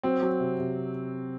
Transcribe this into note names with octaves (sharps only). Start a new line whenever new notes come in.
F#3 C4
F#3
C3
C3